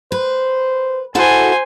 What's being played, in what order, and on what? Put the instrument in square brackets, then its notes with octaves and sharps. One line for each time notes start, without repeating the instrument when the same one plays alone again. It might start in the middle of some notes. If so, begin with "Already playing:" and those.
[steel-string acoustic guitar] B4 [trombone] C5
[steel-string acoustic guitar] E4 F#4 A4 [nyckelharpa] C5 G#5